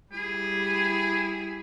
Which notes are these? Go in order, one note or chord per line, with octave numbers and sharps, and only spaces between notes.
G3 E4 G#4